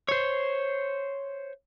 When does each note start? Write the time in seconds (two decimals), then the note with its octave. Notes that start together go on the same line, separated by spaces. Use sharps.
0.09 C5 C#5